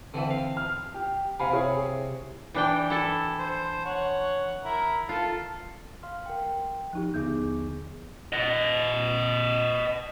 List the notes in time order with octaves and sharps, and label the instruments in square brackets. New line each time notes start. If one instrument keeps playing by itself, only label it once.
[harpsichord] D3 E3 A4 [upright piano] C4 E5
[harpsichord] F5
[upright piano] F6
G4
[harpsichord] C3 [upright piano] F5 G#5 B5
[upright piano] E4 G#4 C#5
[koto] E3 D4 G5
E4 A4 A5
[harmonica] C5
C#5 F#5
E4 A#4
[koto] F4 [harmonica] A4
[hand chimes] F5 C6 F6
A#4 F#5 G5
[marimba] F3 D#4 G4
[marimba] D#2 D3 G6 [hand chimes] B3 D#4 G#4
[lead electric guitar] D#5 F#5